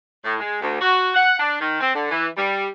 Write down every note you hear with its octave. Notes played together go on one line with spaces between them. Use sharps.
A2
G#3
D2
F#4
F#5
D4
D#3
C4
D3
E3
G3